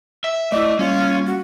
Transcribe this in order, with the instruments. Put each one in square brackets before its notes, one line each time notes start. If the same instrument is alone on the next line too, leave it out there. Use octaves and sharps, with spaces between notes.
[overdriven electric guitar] E5
[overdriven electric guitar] A3 [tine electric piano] E4 D5 D#5 [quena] D6
[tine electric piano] G3 A#3 [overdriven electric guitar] C#4 [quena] F4
[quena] F#4